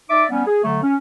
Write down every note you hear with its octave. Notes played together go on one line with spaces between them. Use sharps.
D#4 D5 E5 D6
G3 B3 C#4
G#4
D3 F#3 A3
C#4